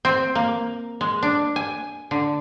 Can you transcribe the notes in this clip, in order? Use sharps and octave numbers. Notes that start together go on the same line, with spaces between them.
C4
A#3
G#3
D4
G#5
D3